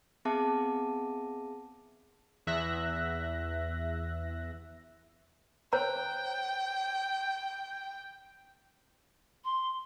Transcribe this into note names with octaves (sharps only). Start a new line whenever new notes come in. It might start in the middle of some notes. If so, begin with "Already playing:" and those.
B3 C4 G#4 E5 A5 D6
E2 E5 F#6 A#6
C5 C#5 G5 A#5
C6